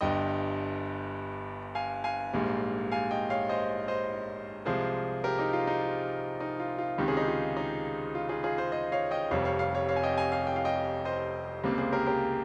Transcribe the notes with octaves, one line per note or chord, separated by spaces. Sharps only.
G1 G2 G3 D#5 G5
F5 G#5
F5 G#5
A#1 G#2 G3 A#3
F5 G#5
D#5 G5
C#5 F5
C5 D#5
C5 D#5
C2 C3 F3 G#3 G#4 C5
G4 A#4
D#4 G4
F4
D#4
F4
D#4
F4
F4
C#2 C3 D#3 G4
G#4
D#4 G4
F4
D#4
F4
F4 G#4
F4 G#4
G#4 C5
C5 D#5
C#5 F5
D#5 G5
F1 F2 C3 G3 C#5 F5
C#5 F5
C#5 F5
C#5 F5
C#5 F5
G#5
D#5 G5
F5 G#5
F5 G#5
G5
F5
D#5 G5
C5 D#5
C#2 C3 G3 A#3
G#4 C5
G4 A#4
G4 A#4